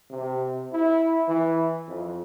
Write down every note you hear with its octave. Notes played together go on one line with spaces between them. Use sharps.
C3
E4
E3
F2